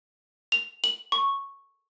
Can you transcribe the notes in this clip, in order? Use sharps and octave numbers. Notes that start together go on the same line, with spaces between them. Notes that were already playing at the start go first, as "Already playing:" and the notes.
F7
F#7
C#6